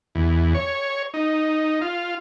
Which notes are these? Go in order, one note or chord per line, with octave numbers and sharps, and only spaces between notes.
E2
C#5
D#4
F4